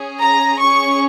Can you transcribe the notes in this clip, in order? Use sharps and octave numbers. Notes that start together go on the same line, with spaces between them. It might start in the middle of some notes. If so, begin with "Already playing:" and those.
Already playing: C#4 G#4
A#5
C#4 G#4 C#6